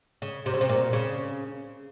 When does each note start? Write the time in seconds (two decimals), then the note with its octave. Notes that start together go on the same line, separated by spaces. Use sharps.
0.22 C#3
0.46 C3
0.54 C#3
0.61 C3
0.69 A#2
0.93 C#3